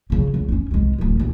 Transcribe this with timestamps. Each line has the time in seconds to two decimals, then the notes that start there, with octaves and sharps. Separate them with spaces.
0.10 C#3 F3
0.34 C#2
0.49 C#4 D#4
0.71 C2 G#3
0.99 D1 E3
1.20 D#2 A#2